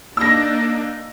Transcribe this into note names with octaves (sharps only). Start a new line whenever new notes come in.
A#3 D4 D#4 E6 A#6